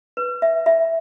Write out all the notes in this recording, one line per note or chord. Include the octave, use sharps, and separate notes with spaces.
B4
E5
E5